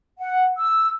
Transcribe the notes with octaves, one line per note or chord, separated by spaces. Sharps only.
F#5
E6